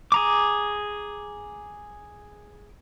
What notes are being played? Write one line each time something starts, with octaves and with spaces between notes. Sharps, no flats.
G#4 A#5 D6